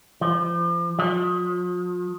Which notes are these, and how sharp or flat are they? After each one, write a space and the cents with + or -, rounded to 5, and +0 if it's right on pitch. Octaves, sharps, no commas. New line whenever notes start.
F3 -30
F3 +40